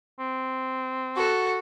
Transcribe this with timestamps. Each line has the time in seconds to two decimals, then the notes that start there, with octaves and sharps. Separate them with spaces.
0.20 C4
1.16 F#4 A4